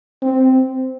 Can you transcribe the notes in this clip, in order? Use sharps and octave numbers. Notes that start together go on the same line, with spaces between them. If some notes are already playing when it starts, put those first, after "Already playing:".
C4